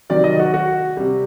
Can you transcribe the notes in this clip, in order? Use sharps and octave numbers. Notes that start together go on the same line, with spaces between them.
C3 D#3 F#3 D5
D#5
F#4
F#4
C3 G3